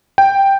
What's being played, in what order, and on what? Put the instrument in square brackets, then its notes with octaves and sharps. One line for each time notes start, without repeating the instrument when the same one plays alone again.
[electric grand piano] G5